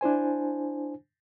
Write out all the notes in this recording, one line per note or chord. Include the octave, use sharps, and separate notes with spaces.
D4 E4 C5 G#5